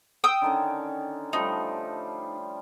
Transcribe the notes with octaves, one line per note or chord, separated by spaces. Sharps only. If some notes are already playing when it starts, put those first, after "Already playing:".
G5 D#6 E6
D3 D#3 C#4
F3 G3 A3 D#4